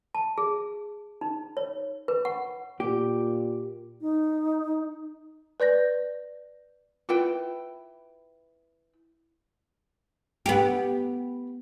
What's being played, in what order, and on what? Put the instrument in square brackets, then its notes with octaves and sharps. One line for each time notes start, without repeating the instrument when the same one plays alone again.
[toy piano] A5
G#4
D#4
C#5
B4
F#5
[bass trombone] A#2 [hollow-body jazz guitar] G4
[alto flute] D#4
[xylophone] B4 D5 G6 A#6
[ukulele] E4 B4 G5 [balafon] F4
[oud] B3 G4